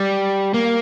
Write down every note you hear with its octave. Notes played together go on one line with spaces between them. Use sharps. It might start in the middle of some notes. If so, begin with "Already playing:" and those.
Already playing: G3
A#3